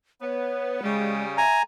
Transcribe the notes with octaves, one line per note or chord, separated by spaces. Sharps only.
B3 C#5
C#3 G3 G#3
E5 G#5 A#5